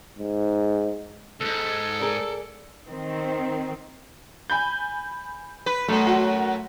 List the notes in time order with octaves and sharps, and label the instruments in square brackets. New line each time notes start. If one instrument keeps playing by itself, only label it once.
[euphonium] G#2
[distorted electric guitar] D2 G#2 [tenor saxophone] A4
[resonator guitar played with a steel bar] G#4 A#4 D5
[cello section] D#3 C4
[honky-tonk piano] G#5 B5 G6
[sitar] B4
[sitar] F#2 [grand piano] A3
[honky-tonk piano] F#4